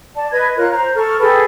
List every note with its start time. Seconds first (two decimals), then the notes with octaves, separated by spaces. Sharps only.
0.15 D5 A5
0.31 B4 D#5 G#6
0.57 F4 A#4 C#5 F#6
0.71 C5 A#5
0.95 A4 C#6 F6
1.20 G#4 A4 B4 G5